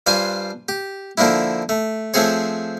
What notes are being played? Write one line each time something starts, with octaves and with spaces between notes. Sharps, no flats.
G2 D4 F4 C5 G#5
G4
D3 F3 A#3 D4 E4
A3
F3 A3 C4 G#4 C#5